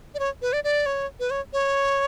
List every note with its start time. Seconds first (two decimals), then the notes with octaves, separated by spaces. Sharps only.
0.15 D5
0.19 C#5
0.42 B4
0.53 D5
0.64 D5
0.86 C#5
1.20 B4
1.31 C#5
1.53 C#5